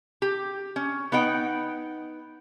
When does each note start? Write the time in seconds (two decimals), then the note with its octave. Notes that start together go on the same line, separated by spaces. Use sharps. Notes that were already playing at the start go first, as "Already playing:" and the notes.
0.22 G4
0.76 C#4
1.12 B3 D#4 F#5 G5